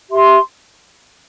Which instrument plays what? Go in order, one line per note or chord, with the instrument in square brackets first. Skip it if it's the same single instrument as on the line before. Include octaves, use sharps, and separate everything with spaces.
[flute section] G4 E5 C6